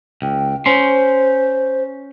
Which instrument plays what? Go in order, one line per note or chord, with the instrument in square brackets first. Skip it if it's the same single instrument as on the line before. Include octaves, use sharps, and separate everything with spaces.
[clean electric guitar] C#2 [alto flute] G5
[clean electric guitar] C#4 C6 [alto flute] C5